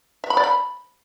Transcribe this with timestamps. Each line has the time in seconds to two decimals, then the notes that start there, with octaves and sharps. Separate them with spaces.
0.24 E5
0.30 B5
0.37 D5
0.44 B5